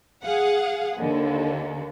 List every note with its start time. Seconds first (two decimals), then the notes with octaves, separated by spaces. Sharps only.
0.24 G#4 F5 F#5
0.98 D#2 D3